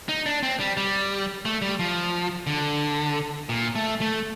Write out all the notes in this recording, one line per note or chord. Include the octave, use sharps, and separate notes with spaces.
D#4
D4
C4
G3
G3
A3
G3
F3
D3
A#2
A3
A3